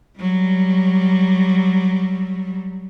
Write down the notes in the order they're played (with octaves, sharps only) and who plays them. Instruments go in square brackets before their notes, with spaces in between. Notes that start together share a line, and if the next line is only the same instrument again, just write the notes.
[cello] F#3 G3